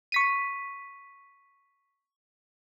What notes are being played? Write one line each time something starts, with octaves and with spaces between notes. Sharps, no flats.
C#6 B6 D#7